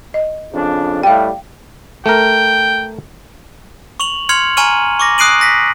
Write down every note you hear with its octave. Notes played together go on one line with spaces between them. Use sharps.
D#5
F2 C#3 D4
A2 G3 F5 G5
A3 A#4 G5
C#6 F7 F#7
C6 F6 G#6 C#7 F7 F#7
G#5 A#5 C#6 F6 D#7 F#7
C#6 D6 A#6
D#6 F#6 C7 D7 D#7 F#7
A#6 B6